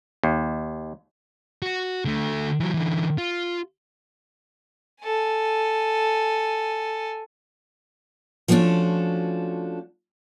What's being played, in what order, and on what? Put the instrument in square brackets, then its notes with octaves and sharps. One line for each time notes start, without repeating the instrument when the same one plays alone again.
[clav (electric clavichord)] D#2
[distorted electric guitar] F#4
D3 A3
E3 F#3
D3 E3
F4
[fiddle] A4 G#5
[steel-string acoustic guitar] F3 A3 B3 C#4 D4 F#4